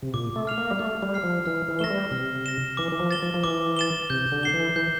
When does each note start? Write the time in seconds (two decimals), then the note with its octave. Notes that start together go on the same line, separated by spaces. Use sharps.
0.02 C3
0.14 A#2 D6
0.36 A3
0.47 F6 C7 F7
0.58 A#3
0.71 G3
0.79 A3 D6
1.02 G3
1.12 F6 C7 F7
1.23 F3
1.46 E3 F6
1.68 E3
1.79 A3 A#6 E7 G7
1.90 G3
2.11 C3 F6
2.44 A#6 E7 G7
2.77 E3 D6
2.92 E3
2.99 F3
3.11 A6 E7 G7
3.22 F3
3.34 F3
3.44 E3 D6
3.76 A6 E7 G7
4.10 C3 G6
4.32 D3
4.43 C7 G7
4.54 E3
4.76 E3 G6